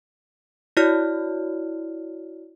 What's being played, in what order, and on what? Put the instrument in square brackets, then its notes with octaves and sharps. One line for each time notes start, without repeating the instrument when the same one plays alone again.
[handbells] E4 F#4 C#5 D5 F6